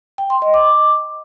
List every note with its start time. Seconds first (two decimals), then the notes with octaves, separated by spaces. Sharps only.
0.18 G5
0.30 C6
0.42 D#5
0.54 D6